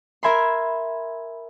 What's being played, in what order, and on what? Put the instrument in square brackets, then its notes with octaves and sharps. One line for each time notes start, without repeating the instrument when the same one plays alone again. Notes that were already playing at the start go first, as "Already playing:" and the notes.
[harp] A#4 E5 G#5 B5 C6